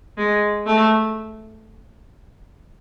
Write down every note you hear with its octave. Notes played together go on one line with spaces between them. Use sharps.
G#3
A3